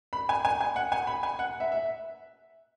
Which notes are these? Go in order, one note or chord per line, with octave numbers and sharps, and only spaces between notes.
B5
G#5
G#5
G#5
F#5
G#5
B5
G#5
F#5
E5
E5